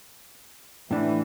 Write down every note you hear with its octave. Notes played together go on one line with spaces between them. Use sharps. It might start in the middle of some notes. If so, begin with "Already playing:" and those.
A2 E3 D4